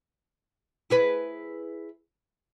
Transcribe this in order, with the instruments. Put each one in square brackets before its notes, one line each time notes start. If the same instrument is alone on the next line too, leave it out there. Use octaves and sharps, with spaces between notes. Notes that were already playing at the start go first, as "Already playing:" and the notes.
[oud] E4 G#4 B4